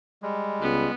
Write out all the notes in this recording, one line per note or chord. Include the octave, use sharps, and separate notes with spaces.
G3 G#3
C#2 B3